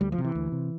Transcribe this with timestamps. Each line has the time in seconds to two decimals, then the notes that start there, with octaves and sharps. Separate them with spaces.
0.01 D2 G3
0.12 F3
0.18 C3
0.25 E3
0.35 D2
0.52 C3